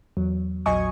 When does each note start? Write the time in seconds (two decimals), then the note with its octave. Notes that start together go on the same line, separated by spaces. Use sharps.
0.17 E2 F#3
0.66 A#1 E2 F#3 D#5 G#5 C#6